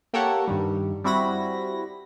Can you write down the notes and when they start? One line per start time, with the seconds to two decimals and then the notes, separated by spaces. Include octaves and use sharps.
0.13 A#3 G4 A4 A#4 C#5 F#5
0.48 G2 D#3 G3
1.04 G3 C4 E4 F#4 B5 A#6